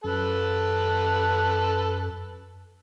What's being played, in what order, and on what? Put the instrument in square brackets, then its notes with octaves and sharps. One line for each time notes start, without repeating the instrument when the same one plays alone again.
[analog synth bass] F#2 [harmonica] A4 B4 A5